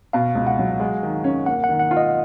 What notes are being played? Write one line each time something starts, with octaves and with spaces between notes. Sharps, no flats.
B2 F5
C#2
F#5
F#3
G#3
D#3
C#4
A#3 F#5
F#5
D#3
F#5
F4
D#5